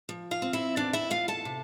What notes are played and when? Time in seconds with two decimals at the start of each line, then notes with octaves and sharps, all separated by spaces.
0.09 F3
0.31 F4 F5
0.42 C4
0.53 E4 E5
0.76 E2 D4 D5
0.93 E4 E5
1.10 E2 F4 F5
1.28 A4 A5
1.45 C3